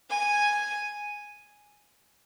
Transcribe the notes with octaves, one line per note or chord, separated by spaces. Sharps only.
G#5